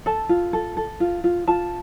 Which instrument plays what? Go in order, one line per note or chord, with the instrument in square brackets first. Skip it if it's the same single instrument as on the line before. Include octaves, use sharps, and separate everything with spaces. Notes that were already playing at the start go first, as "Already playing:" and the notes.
[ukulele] A4 A5
F4
A4
A4
F4
F4
F4 A5